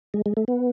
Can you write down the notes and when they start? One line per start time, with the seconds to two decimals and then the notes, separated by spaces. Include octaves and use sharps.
0.14 G#3
0.26 G#3
0.37 A3
0.48 B3